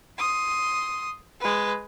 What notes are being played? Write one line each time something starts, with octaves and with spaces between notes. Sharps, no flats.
C6 D#6
G#3 B4